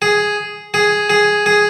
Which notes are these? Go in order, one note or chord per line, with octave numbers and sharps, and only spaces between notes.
G#4
G#4
G#4
G#4